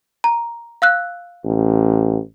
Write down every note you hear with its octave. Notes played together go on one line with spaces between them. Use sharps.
A#5
F5 E6 F#6
A1